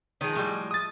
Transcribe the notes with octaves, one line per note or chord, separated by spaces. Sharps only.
D#3 F3 G#3 D#5
A2 G3
D#6 A6